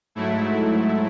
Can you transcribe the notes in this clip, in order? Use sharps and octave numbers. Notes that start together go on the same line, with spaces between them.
G#2 F#3 A3 E4